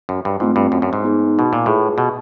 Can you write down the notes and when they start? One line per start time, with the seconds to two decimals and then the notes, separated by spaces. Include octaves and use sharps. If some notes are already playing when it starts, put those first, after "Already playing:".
0.09 F#2
0.25 G2
0.40 G#2 A3 C4 F4
0.56 G2
0.72 F#2
0.82 F#2
0.93 G#2
1.04 B3 D#4 G#4
1.39 B2
1.53 A#2
1.66 A2 F4 G#4 B4
1.98 B2